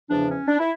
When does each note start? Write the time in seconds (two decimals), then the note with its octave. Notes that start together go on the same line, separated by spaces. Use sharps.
0.10 E2 C#3 F3 D4
0.29 C#4
0.48 D4
0.59 E4